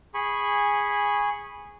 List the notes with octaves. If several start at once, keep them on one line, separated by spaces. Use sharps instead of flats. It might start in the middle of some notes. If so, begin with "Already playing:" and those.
G#4 G#5 B5 C#6